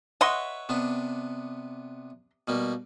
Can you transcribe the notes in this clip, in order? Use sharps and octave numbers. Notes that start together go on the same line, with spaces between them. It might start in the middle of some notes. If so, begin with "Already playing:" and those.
B4 C#5 D#5 E5 F#5 C6
C3 B3 D4
B2 G3 A#3